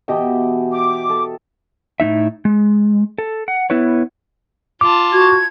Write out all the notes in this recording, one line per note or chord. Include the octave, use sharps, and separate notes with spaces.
B2 E3 G4 D#5 G5
D6
A4
A2 A#3 D#4 E5
G#3
A4
F#5
B3 E4 B4 C#5
F4 A5 D6
F#4 G#6